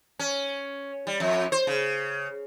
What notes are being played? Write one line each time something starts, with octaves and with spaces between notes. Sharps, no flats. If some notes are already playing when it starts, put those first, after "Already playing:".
C#4
G3
F2
C5
C#3